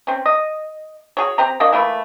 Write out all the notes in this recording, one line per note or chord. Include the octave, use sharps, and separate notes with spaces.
C4 C#4
D#5
F#4 G#4 C#5
C4 G4 A#5
A#3 D4 F#4 D#5
E3 A3 A#3 E4